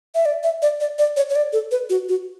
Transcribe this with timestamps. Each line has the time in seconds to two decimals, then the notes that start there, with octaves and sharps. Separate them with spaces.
0.15 E5
0.25 D5
0.43 E5
0.62 D5
0.80 D5
0.98 D5
1.16 C#5
1.30 C#5
1.35 D5
1.53 A4
1.71 B4
1.90 F#4
2.09 F#4